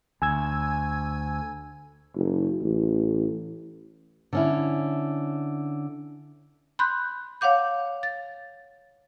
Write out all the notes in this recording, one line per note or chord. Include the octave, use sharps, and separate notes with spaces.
D2 G#5 E6 G#6
F#1
A1
D3 C#4 E4
B5 C6 F#6 G6
C#5 F5 F#5 D6 G6
A6